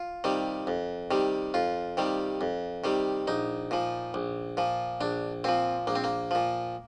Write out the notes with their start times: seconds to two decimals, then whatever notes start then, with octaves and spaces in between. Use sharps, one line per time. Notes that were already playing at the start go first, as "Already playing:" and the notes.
Already playing: F4
0.24 C3 D#3 G3
0.67 F2
1.11 C3 D#3 G3
1.54 F2 F4
1.97 C3 D#3 G3
2.41 F2
2.84 C3 D#3 G3
3.27 A#1 D#4
3.71 A#2 F3
4.14 A#1
4.57 A#2 F3
5.01 A#1 D4
5.44 A#2 F3 C4
5.87 A#1 A#3
5.95 C4
6.04 A#3
6.31 A#2 F3